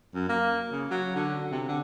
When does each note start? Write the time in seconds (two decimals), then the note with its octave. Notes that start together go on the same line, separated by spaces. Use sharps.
0.14 F#2
0.29 A#3
0.71 C#3
0.91 F#3
1.15 D3
1.51 C3
1.68 D3